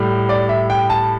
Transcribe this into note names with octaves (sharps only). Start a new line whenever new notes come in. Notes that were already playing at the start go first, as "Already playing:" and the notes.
Already playing: A2 G3
D5
E5
G5
A5